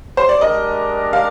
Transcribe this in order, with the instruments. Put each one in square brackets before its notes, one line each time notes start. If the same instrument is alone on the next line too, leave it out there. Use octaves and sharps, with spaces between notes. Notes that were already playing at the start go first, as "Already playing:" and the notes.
[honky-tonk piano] C5
D5
[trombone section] G#3 D4 G4 A#4 [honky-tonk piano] D#5
[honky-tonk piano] F5